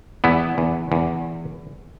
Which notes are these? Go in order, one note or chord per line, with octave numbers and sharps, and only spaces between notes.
E2 B3 E4
E2
E2